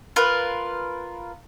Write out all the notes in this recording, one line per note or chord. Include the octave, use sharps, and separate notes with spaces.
F4 A#4 B4